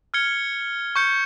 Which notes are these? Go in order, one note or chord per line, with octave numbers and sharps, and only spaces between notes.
F6 G#6 C#7 G7
C#6 G6 C#7